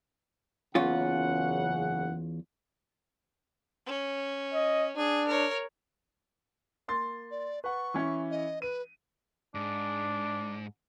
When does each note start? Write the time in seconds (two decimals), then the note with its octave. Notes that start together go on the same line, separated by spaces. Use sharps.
0.75 F#1 E2 C#3 C#4 F4 F#5
3.86 C#4
4.54 D#5
4.97 D4 G#4
5.28 A#4 C#5
6.88 A#3 C6 A6
7.31 D5
7.64 B4 F#5 C#6
7.94 E3 C#4 E4
8.31 D#5
8.62 B4 D#7
9.55 G#2 D4